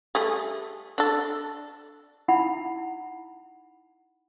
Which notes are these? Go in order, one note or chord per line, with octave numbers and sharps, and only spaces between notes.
G3 A3 G#4
D4 A4
D#4 E4 F#5 B5